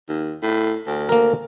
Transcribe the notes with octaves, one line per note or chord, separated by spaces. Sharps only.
D#2
A2
D2
A#3 A#4